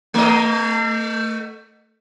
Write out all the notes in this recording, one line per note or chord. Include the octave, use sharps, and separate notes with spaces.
A3 D#5